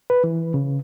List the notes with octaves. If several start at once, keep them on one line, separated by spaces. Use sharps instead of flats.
B4
E3
C#3